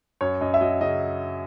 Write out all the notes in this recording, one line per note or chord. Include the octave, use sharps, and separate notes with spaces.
F#2 C#5
F#2 D#5
E5
F#3 D#5
C#3 D#5